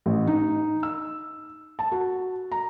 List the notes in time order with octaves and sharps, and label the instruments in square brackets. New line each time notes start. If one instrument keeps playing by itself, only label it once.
[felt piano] A1
D#4
E6
A5
F#4
A#5